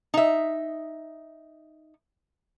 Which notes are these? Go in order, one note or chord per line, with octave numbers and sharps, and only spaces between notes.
D#4 E5